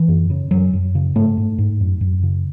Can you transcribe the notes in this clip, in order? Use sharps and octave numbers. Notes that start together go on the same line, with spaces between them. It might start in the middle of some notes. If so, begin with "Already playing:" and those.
Already playing: E3
F#2
C#3
F#2 F#3
F#2
C#3
G#2 A3
G#2
G#2
F#2
F#2
C#3